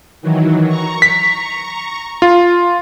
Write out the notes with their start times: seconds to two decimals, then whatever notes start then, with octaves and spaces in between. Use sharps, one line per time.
0.22 D#3 E3 F#3
0.67 A#5 C#6
1.02 B6
2.22 F4